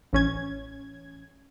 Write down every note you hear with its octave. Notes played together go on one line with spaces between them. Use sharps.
A1 C#4 G#6